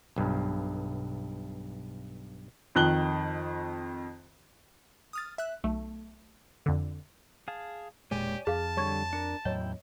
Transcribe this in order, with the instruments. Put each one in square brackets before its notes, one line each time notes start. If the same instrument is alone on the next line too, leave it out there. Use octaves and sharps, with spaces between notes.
[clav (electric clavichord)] B1 G2
[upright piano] F2 D#3 F#6 G7
[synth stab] D#6 F6 A6
E5 F#6
B1 A3
F2 D3
[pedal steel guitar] G#4 F5 A5
[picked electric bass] E1 A#2 G#3 [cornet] G4 [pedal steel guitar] C#5 D5 G#5
[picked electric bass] F2 [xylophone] G#4 F5 [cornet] A5 [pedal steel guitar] F6
[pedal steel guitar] D3 G3 [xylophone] C#5 C#6 G#6
[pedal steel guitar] D4 A#4 [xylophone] C#7
[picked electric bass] E2 A2 F#3 [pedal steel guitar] E4 G5 [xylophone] C#5 D#5